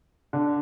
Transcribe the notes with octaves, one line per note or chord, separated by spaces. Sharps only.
D3